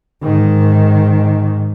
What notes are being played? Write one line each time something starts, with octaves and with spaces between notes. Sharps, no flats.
G#2 D#3